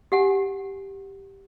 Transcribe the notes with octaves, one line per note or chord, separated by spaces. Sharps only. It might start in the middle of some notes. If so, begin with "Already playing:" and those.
G4 F#5 G#5